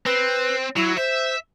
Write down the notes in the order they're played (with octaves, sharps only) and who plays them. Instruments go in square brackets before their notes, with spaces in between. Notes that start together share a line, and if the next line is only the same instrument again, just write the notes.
[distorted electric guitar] C4 [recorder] B4
[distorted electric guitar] F#3 [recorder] E4
[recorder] C5 [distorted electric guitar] E5